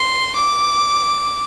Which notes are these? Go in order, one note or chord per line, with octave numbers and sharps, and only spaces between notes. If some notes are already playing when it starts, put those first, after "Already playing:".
Already playing: C6
D6